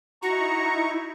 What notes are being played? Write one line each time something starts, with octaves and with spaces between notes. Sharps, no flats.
D#4 E4 F#4 A#5 C#6